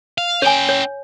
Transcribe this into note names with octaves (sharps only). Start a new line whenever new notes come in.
F5
C#4 C#5 G5 G#5
C#5